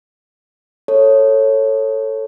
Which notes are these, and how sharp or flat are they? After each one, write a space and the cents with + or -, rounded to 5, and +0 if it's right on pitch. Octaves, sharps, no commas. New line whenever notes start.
A4 +10 C#5 -10